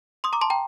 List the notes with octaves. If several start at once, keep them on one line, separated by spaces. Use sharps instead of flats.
C6 D#6
A#5 D6
A5 C6
G5 A#5